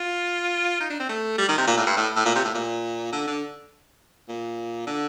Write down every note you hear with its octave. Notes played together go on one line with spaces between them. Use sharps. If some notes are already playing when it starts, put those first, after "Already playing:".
Already playing: F4
D#4
D4
C4
A3
G3
D#3
C3
A#2
A2
G2
A2
A2
A#2
C3
A2
A#2
D3
D3
A#2
D3